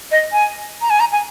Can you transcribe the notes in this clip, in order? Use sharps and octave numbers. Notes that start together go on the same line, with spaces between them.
D#5
G#5
A#5
G#5
A#5
G#5